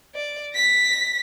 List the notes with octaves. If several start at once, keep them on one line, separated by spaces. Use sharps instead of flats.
D5
A#6 B6